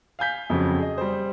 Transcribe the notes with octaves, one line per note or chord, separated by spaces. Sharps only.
F5 G#5 G6 B6
F2 C#3 F#3 C4
G#4 D#5
G3 C5